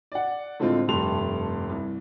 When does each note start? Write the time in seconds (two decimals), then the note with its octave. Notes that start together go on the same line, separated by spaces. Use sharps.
0.12 D5 F#5
0.59 A2 D3 G#3 C4 F4
0.88 F1 G2 A3 G4 C6 F7
1.69 C2